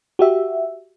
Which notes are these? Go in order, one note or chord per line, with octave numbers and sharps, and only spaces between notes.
F#4 G4 E5